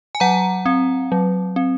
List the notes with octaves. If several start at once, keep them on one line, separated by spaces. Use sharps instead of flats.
G#5
F#3 F#5 A#5
C4
F#3
C4